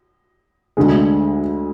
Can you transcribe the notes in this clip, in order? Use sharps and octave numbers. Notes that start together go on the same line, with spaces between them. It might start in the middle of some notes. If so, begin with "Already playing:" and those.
D2 D3 G#3